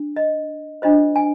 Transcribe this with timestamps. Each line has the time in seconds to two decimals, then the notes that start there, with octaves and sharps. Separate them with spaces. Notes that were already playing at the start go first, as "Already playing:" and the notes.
Already playing: D4
0.16 D#5
0.82 D4 F4 C5 D#5
1.16 G#5